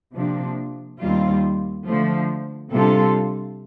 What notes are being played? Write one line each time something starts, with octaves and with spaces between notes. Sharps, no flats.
C3 F3 A#3 D4
D#2 D#3 G3 C4 F4
D3 F3 A3
C3 G3 D4 F4 A4